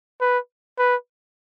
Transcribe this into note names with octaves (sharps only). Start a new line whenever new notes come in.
B4
B4